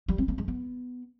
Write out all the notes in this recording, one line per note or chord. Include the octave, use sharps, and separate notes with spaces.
G3
C4
A#3
G#3
B3